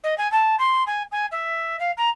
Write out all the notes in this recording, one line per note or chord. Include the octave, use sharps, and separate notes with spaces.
D#5
G#5
A5
C6
G#5
G#5
E5
F5
A#5